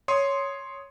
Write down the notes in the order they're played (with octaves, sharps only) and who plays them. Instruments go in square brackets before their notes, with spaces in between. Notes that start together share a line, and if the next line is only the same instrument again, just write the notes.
[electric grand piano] C#5 C6 D#6